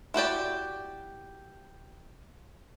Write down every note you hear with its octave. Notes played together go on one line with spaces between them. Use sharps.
E4 F#4 G4 D5